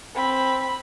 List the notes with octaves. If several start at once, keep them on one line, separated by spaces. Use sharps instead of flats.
C4 B5